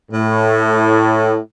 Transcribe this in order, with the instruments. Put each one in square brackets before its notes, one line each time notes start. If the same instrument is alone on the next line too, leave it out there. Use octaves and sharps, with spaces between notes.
[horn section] A2